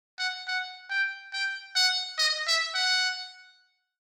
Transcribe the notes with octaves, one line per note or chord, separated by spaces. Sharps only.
F#5
F#5
G5
G5
F#5
D#5
E5
F#5